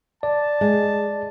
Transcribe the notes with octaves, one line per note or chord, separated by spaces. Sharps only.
D5 A5
G#3